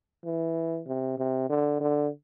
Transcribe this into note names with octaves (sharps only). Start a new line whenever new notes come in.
E3
C3
C3
D3
D3